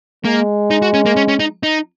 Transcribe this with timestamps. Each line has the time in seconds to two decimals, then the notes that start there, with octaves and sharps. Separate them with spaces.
0.25 G#3 A#3
0.71 D#4
0.82 F#4
0.94 C#4
1.06 A#3
1.16 C#4
1.28 C#4
1.40 D#4
1.63 D#4